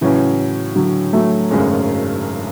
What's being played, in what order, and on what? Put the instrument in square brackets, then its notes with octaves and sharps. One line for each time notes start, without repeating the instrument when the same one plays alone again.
[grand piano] A2 F#3 C#4 [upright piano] C#3 E3
[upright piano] D3 F#3
F#3 A3
[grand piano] G#1 F#2 C#3 G#3 C#4